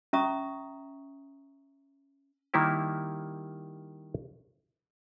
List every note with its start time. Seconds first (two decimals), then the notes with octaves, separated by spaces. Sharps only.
0.13 C#4 E5 A#5 C#6 D#6
2.54 D#3 G3 A#3 E4 G4